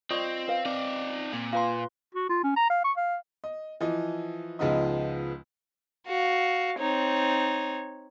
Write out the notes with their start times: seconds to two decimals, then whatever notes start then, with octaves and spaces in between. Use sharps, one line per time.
0.11 C4 F4 D5 D#5 C#6 D#6
0.48 C#4 B4 F5
0.65 C4 D#4 D5
1.33 A#2
1.53 F4 B4 F5 A#5 C6
2.15 F#4
2.29 F4
2.44 C#4
2.56 A#5
2.70 F5
2.84 C#6
2.97 F5
3.44 D#5
3.81 E3 F3 D#5
4.59 C#2 F3 G#3 B3 D#4 D#5
6.07 F#4 F5
6.79 C4 D#4 C#5